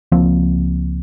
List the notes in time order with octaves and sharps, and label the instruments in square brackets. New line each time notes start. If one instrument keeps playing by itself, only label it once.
[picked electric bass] C#2 F3 A#3 C4